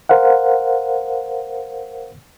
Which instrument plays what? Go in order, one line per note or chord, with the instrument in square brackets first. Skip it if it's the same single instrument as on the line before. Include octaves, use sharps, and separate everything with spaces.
[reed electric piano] A#4 C5 F5 F#5